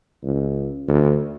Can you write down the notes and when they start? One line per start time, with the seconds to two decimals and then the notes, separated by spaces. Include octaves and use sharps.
0.23 C#2
0.88 D2